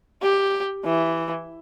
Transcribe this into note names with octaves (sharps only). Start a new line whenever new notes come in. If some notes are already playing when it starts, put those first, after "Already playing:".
G4
E3